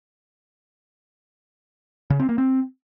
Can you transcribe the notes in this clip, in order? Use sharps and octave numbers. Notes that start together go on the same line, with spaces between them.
C#3
C4
A#3
C4